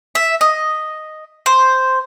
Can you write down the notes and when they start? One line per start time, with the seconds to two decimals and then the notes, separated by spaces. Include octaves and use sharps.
0.15 E5
0.41 D#5
1.46 C5